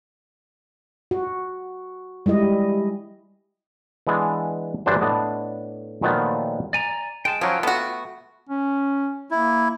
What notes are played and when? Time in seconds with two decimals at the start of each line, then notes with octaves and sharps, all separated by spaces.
1.11 F#4
2.26 G3 G#3 E4 D#5
4.07 E3 G#3 B3 D4
4.86 G2 D3 E3 F#3 D4 C5
5.01 A2 B3 D4 D#5
6.02 A#2 D#3 F3 F#3 A3 B3
6.73 D5 G#5 A#5
7.25 G#3 G5 A5
7.41 F3 F#3 C#4 F4 F#4 G5
7.63 A3 B3 F#4
8.49 C#4
9.31 A#3 E4